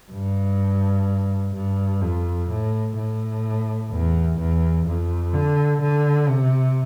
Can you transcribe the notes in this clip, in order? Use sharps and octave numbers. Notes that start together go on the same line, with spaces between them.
G2
G2
F2
A2
A2
E2
E2
F2
D3
D3
C3